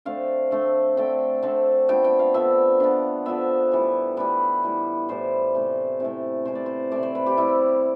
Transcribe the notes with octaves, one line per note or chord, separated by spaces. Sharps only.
D3 A3 C4 F5
D3 A3 C4
D3 A3 C4 G5
D3 A3 C4
D3 F3 B3 G5
G5
F5
D3 F3 B3 E5
D3 F3 B3
D3 F3 B3 E5
A2 E3 G3
A2 E3 G3 B4
A2 E3 G3
A2 E3 G3 C5
C3 E3 A3
C3 E3 A3
C3 E3 A3 C5
D5
C5
C3 E3 A3 D5
C5
B4
G4
C3 G3 C4 E4